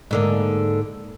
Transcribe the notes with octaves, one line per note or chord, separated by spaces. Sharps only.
G#2 D3 A#3